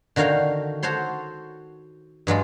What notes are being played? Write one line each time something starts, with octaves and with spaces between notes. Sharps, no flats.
D3 D#3 F#4 C#5 F5 G5
F#4 A4 C5 C#5 C6
G2 F#3 G#3 F4